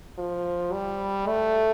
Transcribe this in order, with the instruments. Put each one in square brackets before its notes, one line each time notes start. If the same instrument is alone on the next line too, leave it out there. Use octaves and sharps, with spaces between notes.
[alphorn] F3
G3
A3